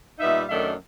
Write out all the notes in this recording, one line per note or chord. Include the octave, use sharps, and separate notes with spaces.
A#2 G3 B3 D#4 E5
F#2 D#3 F#3 A3 D4 E5